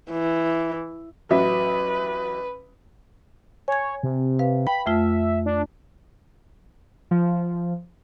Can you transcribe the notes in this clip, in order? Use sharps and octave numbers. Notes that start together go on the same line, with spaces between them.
E3
A1 F#3 B4 E5
C#5 G#5 G#6
C3
B4 F5
G5 B5
F2 A3 F4 E5
D4
F3